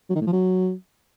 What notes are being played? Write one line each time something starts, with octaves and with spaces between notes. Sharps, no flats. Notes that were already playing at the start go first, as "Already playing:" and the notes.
F#3
D#3
A2
F3
F#3